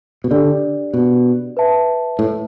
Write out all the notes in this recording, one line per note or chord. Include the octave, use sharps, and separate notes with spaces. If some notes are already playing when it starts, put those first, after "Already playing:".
B2
D3 D4 G4 D5
B2
B4 E5 A5
A2